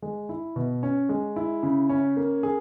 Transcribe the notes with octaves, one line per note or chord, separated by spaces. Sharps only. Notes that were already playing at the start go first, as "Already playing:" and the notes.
G#3
E4
B2
C#4
G#3
E4
C#3
C#4
A#3
G#4